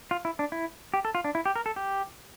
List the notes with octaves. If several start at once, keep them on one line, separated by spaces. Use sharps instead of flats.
F4
E4
D4
E4
G4
A4
F4
D4
E4
G4
A#4
A4
G4